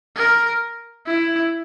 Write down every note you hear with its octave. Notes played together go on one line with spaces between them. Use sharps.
A#4
E4